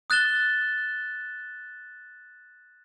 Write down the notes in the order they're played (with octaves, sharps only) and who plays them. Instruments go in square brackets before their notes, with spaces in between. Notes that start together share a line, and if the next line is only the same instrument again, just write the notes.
[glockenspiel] D#6 F#6 A6 E7 G7